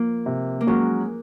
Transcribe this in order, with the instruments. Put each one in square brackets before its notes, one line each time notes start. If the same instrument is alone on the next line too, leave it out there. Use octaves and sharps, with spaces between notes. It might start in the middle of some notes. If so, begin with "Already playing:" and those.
Already playing: [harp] F3 A#3
[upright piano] C3
[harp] A#3
[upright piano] F#3 C#4 F#4 A#4 [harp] G#3